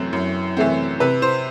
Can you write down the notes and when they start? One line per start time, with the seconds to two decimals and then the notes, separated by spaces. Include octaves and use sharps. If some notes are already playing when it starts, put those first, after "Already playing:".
Already playing: F#2 E3 A3 C4
0.13 F#2
0.57 E3 A3 C4
1.00 C3 B4
1.22 C5